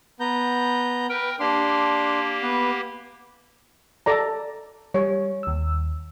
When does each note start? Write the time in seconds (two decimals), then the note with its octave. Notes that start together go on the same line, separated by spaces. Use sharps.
0.20 B3 A#5 G6
1.09 A#4 B4 G5
1.40 A#3 D4 G4 C6
2.42 B3 B4
4.06 A4 D5 A#5
4.94 G3 C#5
5.43 D#2 E6